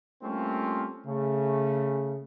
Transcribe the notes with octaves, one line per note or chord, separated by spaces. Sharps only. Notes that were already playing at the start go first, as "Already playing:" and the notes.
G3 A3 A#3 C4 C#4 F4
C#3 A3